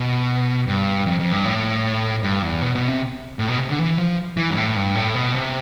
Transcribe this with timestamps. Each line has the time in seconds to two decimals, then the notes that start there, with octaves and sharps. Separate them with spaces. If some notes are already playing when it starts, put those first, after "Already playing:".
Already playing: B2
0.67 G2
1.06 F2
1.20 F2
1.32 G2
1.45 A2
2.23 G2
2.42 E2
2.62 B2
2.75 B2
2.88 C3
3.39 A2
3.49 B2
3.59 C3
3.69 D3
3.79 E3
3.98 F3
4.37 E3
4.50 G2
4.57 A2
4.76 G2
4.95 A2
5.15 B2
5.34 C3